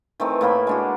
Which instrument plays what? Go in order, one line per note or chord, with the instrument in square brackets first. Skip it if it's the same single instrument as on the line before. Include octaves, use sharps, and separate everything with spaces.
[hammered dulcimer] D#3 E3 A3 C4
A2 A#3 B5
G#3 D4 F#4